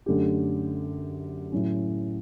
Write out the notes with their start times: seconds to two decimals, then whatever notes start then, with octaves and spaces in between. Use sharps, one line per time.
0.06 F#2 D3 A3 C#4 G4
1.52 A2 F#3 C#4